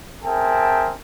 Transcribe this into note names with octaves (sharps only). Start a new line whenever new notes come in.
C4 G#4 A#4 E5 G5 A5